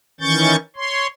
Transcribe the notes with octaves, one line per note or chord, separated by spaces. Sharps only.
D#3 E3 C#4 C#6 G6 A6
C#5 C6